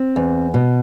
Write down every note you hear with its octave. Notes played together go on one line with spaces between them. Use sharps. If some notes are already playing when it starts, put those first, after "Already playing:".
Already playing: C4
E2
B2